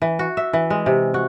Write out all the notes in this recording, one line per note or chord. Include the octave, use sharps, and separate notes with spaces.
E3
F#4
E5
E3
G#3
C3
F#4